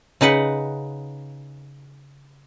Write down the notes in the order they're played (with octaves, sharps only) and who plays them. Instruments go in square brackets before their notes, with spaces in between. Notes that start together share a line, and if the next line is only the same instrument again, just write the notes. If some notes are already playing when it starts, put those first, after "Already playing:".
[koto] C#3 D#4 B4 F#5